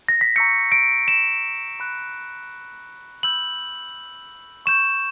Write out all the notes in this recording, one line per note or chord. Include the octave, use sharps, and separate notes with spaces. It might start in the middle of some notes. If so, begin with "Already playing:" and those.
A#6
B6
A#5 C#6 E6 G6 C#7
D7
E7
B5 F#6
B5 E6 G6 F#7
C#6 G6 E7